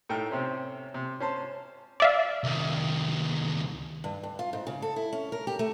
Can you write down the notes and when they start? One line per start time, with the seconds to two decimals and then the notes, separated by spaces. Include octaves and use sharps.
0.09 A2 A3 D#4 G5 F6
0.31 C3 C4 C#4
0.94 C3
1.20 C#4 C5 A5 C6
2.00 D5 E5 F5
2.44 C2 D#3
4.04 G2
4.23 G2
4.39 F4
4.53 G#2
4.67 C#3
4.82 A4
4.96 E4
5.13 C#4
5.32 A#4
5.47 G4
5.59 A3